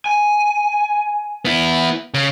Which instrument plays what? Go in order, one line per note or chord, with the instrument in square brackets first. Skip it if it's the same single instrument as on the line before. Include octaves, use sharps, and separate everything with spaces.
[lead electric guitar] G#5
[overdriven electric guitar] B3 E4
C#3